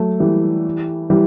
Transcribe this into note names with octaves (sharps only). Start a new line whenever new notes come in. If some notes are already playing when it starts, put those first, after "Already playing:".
Already playing: F#3 A3
E3 G3
E3 G3